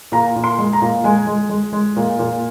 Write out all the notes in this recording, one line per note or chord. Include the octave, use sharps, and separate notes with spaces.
A#2 A#5
A#2
C6
G#3
A#5
A#2
G#3 G#5
G#3
G#3
G#3
A#2
A#2